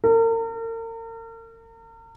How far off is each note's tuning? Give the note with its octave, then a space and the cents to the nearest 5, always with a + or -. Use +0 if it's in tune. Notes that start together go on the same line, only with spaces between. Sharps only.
A#4 -40